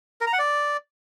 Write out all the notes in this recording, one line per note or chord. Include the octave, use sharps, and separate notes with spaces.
A#4
A#5
F#5
D5